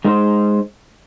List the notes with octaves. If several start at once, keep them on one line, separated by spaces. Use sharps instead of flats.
G#3 D#4 C5